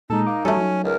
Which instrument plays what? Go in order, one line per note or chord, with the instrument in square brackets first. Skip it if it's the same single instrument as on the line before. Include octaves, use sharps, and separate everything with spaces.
[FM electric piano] A#2 G#3 [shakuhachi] D#4 [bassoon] A4
[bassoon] A#3 [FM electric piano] D6
[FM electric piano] G3 F#4 [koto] A3 A4 [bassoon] C#4
[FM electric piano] F#3 D#4
[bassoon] C#2 [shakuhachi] A#4